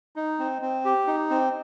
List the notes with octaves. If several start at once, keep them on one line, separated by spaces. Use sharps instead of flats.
D#4
C4
C4
G4
D#4
C4